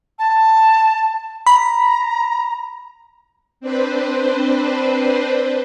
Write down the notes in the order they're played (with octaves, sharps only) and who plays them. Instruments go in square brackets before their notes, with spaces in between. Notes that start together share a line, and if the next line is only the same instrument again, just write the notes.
[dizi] A5
[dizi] A#5 [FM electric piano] B5
[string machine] C4 D4 B4 C5